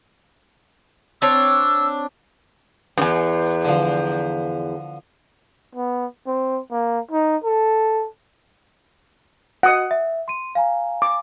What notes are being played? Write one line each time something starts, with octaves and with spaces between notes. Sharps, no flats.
C4 D4 C#5 E6
E2 G2
D3 F3
B3
C4
A#3
D#4
A4
F#4 D#5 F#5 D#6
E5
C6 D#7
F5 G#5 A#5
D6